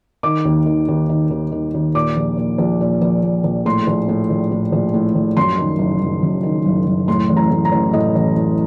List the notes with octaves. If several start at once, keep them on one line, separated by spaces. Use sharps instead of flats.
D#3 D6
D#2
D#3
D#2
D#3
D#2
D#3
D#2
A#2 D6
A#1
A#2
A#1
A#2
A#1
A#2
A#1
A2 C6
A#1
A2
A#1
A2
A#1
A2
A#1
F#2 C6
D#3
F#1
F#1
F#2
D#3
F#1
F#1
A2 C6
A1
A#5
A2
A#5
A1
A2 D#5
A1
A2